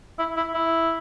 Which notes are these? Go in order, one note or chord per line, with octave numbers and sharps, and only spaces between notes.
E4
E4
E4